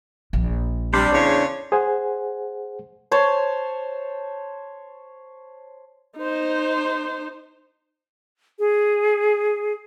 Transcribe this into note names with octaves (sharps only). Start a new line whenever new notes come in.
A#1
C3 G3 D4 C5
E2 C#3 C#5
G#4 C5 F#5 G#5
C5 C#5 A5 C6
D#4 C5
G#4